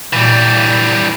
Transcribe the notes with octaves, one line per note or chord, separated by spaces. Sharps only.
A#2 E3 G3